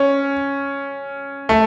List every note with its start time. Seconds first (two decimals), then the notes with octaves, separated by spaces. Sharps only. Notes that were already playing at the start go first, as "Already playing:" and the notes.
Already playing: C#4
1.49 A3